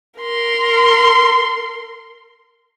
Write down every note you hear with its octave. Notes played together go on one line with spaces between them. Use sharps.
A#4 C6